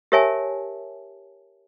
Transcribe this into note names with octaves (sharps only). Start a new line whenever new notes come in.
G4 A#4 C#5 E5 G#5 A5